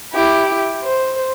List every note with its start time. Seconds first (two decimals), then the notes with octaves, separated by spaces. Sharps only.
0.12 E4 G4
0.82 C5